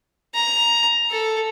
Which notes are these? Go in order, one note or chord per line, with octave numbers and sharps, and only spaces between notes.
A#5
A4